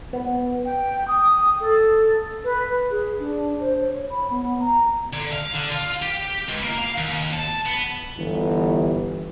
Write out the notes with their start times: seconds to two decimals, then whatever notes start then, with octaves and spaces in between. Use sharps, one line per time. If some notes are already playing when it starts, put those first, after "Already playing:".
0.13 B3
0.65 G5
1.08 D#6
1.60 A4
2.44 B4
2.91 G#4
3.19 D4
3.60 C5
3.81 C#5
4.10 B5
4.30 B3
4.61 A#5
5.13 D3
5.33 F5
5.53 D3
5.71 F4
6.02 G4
6.49 C#2
6.64 A#3
6.78 F5
6.97 D#2
7.34 A5
7.66 B3
8.18 G1 E3